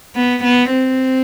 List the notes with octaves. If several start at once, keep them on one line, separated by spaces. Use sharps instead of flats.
B3
B3
C4